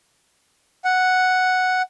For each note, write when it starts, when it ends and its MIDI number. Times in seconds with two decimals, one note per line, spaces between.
0.85 1.82 78